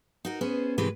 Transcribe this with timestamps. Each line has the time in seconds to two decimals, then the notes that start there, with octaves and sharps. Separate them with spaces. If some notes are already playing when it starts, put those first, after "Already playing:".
0.25 D#4 F#4 A#4
0.41 B3 C#4 G#4 C5
0.78 G#2 C3 D#3 E3 G#3 B4